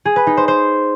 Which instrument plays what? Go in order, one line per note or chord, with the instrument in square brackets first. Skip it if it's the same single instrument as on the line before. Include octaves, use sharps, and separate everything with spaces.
[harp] G#4
B4
D#4
C5
C5